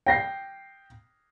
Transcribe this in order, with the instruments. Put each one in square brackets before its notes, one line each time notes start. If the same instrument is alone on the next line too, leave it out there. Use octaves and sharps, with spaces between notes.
[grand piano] G5 A#6 C7